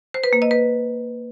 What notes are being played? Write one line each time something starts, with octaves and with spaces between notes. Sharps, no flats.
C5
B4
A#3
D#5
B4